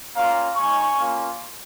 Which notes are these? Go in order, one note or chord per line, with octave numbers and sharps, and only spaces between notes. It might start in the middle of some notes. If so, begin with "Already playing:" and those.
A#3 C#4 F4 F5 A#5
G#3 D#4 G#5 C#6
A#3 C#4 F4